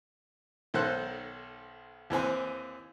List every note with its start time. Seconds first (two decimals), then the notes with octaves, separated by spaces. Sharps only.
0.74 B1 D#3 A4 C5 F#6
2.10 D#2 E3 C4 G#5